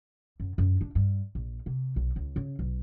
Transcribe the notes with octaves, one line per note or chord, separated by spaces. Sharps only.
F#2
F#2
D4
G2
A#1
C3
B1
C#2
C#3
B1